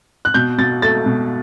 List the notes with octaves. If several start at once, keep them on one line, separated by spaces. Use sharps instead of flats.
F#6
B2 G6
B2 A6
A3 A6
B2